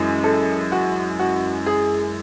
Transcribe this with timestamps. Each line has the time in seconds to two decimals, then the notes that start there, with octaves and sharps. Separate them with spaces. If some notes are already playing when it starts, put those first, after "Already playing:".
Already playing: F#2 E3 G#3
0.24 A4
0.72 F#4
1.20 F#4
1.66 G#4